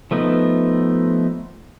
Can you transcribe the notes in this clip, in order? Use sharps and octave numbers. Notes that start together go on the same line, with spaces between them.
F3 A3 B3 D#4